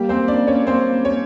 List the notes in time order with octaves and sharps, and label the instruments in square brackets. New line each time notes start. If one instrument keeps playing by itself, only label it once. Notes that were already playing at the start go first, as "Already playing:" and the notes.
Already playing: [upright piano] G3 G4 [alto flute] A#3
[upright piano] C4 C5
D4 D5
C#4 C#5
C4 C5
C#4 C#5